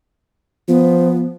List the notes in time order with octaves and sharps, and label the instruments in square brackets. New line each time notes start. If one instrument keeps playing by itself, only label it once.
[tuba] F3 [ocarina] B3